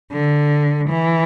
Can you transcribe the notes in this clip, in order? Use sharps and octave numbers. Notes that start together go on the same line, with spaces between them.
D3
E3